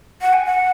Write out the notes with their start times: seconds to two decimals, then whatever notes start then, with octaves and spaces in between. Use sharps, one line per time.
0.22 F#5
0.33 G#5
0.45 F#5